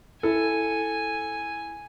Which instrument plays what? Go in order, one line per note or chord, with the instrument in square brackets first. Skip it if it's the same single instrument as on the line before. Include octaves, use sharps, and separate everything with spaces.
[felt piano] E4 [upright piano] A4 [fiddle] G#5